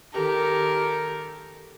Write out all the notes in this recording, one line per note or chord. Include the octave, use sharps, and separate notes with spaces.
D#3 G4 A4 A#4